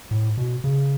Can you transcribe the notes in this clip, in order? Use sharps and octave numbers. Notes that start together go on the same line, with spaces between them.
A2
B2
C#3